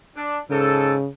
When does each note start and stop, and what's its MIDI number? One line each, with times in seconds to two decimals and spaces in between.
0.15 0.39 62
0.50 0.95 44
0.50 1.08 49
0.50 0.95 69